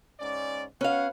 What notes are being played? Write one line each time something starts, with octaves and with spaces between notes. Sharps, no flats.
G#2 C#4 D5
C#4 F#4 B4 F5 F#5